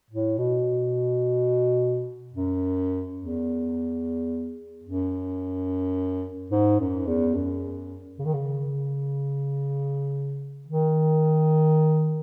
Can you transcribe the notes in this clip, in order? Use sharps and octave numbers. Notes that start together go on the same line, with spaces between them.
A2
B2
F#2
E2
F#2
G#2
F#2
E2
F#2
C#3
D#3
C#3
D#3